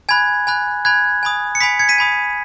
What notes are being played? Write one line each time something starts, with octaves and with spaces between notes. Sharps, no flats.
G#5 B5 F#6 G#6
G#5 B5 F#6
G#5 B5 F#6 G#6
G#5 B5 D#6
C#7
G#5 B5 D#6 B6
G#6 C#7
B6 D#7
G#5 B5 D#6